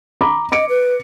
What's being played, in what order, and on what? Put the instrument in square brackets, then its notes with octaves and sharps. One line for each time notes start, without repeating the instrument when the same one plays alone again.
[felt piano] A#5 B5 D6
[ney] D#5 [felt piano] D6 C#7 D7
[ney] B4